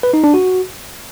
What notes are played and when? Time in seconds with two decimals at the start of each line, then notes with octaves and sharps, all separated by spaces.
0.03 B4
0.13 D#4
0.24 D4
0.34 F#4